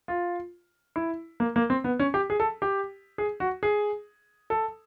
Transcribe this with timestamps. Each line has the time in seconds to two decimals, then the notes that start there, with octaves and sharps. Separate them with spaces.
0.08 F4
0.96 E4
1.40 A#3
1.56 A#3
1.70 C4
1.84 B3
1.99 C#4
2.14 G4
2.30 G#4
2.40 A4
2.62 G4
3.18 G#4
3.40 F#4
3.63 G#4
4.50 A4